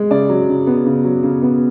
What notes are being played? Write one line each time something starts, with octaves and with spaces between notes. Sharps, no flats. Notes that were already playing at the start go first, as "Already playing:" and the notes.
Already playing: G#3
C#3 D5
F#3
C#3
B3
C#3
F#3
C#3
B3